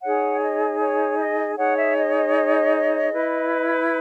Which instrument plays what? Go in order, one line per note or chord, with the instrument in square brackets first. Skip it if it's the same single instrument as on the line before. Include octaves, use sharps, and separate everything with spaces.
[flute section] D#4 G#4 C#5 F#5
D#5
C#5
D#5
D#4 G#4 C#5 F#5
E5
D#5
D#5
E4 B4